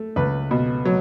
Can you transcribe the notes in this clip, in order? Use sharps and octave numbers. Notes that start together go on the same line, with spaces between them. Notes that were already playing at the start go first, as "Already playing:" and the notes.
Already playing: A3
C#2 B4
B2
F#3